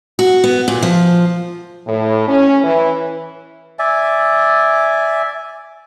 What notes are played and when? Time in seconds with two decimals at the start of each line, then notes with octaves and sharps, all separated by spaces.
0.19 F#4
0.44 B3
0.68 A#2
0.82 F3
1.87 A2
2.28 C#4
2.64 E3
3.79 D5 E5 G#5